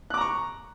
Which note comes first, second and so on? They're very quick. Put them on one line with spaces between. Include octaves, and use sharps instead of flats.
F#6 D6 A#5 C#6